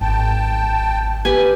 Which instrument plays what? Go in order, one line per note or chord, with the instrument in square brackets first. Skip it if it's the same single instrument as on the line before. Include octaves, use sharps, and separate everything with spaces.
[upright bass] G#1 [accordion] G5 A5
[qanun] G4 B4 G#5